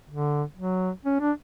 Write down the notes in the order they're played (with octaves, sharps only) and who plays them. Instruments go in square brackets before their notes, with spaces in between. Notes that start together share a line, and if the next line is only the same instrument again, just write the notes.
[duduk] D3
F#3
C#4
D4